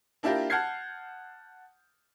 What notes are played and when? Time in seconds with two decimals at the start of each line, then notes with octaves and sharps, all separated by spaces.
0.23 A#3 D4 E4 F4 G4 A#4
0.50 F#5 A5 F6 G6 G#6 C7